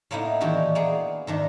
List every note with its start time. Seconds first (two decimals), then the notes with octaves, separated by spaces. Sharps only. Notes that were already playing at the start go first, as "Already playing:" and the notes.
0.11 A2 A#3 B3 D#4 E4
0.40 A#2 D#3 E3 D4 F#4 G4
0.75 A#3 B3 G#4
1.27 G#2 D#3 D4